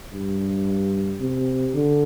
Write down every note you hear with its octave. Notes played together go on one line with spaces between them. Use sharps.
G2
C3
D3